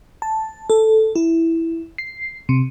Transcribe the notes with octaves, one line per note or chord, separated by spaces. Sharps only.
A5
A4
E4
C7
C3